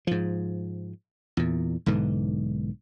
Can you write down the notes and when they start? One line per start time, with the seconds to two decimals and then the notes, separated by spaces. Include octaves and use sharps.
0.07 G#2 F3
1.37 E2 A#2
1.86 B1 G#2 D3 E3